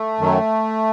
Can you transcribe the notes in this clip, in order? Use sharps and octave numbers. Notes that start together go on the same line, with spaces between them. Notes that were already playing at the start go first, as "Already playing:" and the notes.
Already playing: A3
F#2 D#3 F#3